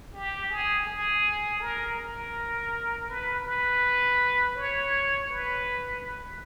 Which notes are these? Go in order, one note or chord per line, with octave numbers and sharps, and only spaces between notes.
G4
G#4
G#4
A#4
A#4
B4
B4
C#5
B4